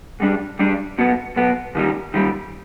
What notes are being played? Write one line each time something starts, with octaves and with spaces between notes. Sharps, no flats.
G#2 G3 D4
G#2 G3 D4
B1 B2 B3
B1 B2 B3
D#2 D#3 G3
D#2 D#3 G3